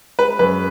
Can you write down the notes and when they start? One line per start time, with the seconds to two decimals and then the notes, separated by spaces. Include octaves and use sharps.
0.19 G#3 B4
0.39 F#2 B4